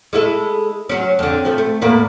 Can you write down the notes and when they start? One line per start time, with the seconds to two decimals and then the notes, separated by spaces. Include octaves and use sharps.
0.13 G#3 E4 A4
0.89 F#3 C#4
1.19 F2 D3
1.45 F3 A3
1.58 A3
1.81 E2 A2 A#3